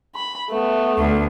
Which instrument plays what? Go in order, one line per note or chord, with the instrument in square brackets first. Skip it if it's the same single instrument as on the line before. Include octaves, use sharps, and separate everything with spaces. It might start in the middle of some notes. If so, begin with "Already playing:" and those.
[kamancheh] B5
A3 B3
[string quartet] D2